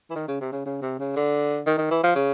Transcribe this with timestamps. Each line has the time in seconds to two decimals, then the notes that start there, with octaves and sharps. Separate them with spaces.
0.10 E3
0.16 D#3
0.28 C#3
0.41 C3
0.52 C#3
0.65 C#3
0.82 C3
0.99 C#3
1.16 D3
1.66 D#3
1.78 D#3
1.91 E3
2.03 F3
2.15 C#3